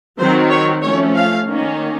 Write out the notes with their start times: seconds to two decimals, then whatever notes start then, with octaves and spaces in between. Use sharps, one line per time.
0.18 D#3 F#3 C4 C5
0.50 C#5
0.82 F3 A3 C#4 C#5
1.14 F5
1.46 D#3 A#3 C#4